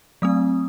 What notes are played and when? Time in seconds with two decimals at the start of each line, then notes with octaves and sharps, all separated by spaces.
0.22 F#3 A3 C4 D#6